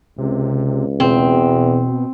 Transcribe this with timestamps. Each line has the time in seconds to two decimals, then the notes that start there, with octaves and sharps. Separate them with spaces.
0.18 C#2 C3
1.00 E2 B2 C4